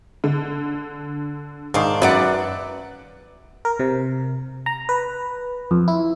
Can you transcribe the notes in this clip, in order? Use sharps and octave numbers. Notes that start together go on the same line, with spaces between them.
D3
G#2 D#3 D4 F5
F#2 B4 D5 F#5
A#4
C3
A#5
B4
F2
E4